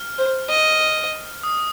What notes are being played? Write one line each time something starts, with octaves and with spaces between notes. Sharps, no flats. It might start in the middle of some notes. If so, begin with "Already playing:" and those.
Already playing: F6
C5
D#5
D#6